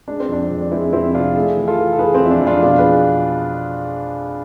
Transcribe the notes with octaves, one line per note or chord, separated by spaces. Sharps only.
G#3 D4
C4
F2 D4
F2
D4
G#3 C4 E4
F2 C4 E4
C3 D4 F4
A3 E4 G#4
E3
F4 A4
E3
A4
E3 G#4 B4
C4
F2
E4
D4
F2
D4 F4
B2 D4 F4
G#4 B4